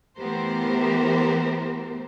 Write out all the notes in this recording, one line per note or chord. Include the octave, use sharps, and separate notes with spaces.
E3 A3 B3 G4 A#4 C5